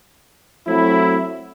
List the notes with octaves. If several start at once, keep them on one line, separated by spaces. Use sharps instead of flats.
F#3 A3 C4 E4